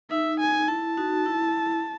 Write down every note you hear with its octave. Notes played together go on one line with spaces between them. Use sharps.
D#4 E5
G#5
E4 A5
D#4 F#4
E4